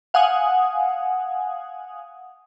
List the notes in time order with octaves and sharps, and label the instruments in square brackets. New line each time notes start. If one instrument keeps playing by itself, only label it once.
[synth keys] F5 F#5 G#5 D#6